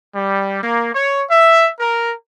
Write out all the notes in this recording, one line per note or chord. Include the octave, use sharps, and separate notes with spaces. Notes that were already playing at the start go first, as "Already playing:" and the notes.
G3
A#3
C#5
E5
A#4